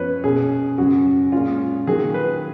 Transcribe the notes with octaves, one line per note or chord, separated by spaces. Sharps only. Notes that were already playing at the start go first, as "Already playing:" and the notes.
Already playing: F#2 F3 B3 B4 C#5
B2 A#3 C#4 G#4
F#2 C#3 F#3 C#4 F#4
A#2 G#3 C#4 F4
D#3 F#3 A#3 F4 G#4
B4